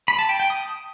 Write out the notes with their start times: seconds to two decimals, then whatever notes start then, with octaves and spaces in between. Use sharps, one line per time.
0.08 B5
0.19 A5
0.29 G5
0.40 G5
0.50 D#6